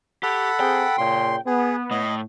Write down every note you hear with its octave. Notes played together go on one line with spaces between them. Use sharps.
G4 A4 F#5 B5
C4 G#4 G5
A#2 C#3 C6
B3 G#4
A2 D#5